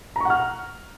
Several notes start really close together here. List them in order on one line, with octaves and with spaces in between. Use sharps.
A#5 C#6 F#5 F6